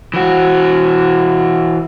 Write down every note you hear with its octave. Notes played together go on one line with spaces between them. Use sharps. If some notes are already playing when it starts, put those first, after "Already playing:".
E3 F#4